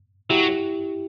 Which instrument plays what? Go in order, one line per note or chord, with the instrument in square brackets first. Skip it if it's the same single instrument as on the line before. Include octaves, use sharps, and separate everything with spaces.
[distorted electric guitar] F#3 [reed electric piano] E4 G4